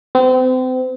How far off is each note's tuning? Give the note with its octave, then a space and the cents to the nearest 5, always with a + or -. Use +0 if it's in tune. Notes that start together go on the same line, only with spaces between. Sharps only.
C4 -35